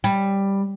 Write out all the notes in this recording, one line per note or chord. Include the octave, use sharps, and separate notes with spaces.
G3